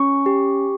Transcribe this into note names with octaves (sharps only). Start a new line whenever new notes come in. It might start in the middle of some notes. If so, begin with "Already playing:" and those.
Already playing: C#4 C#6
G4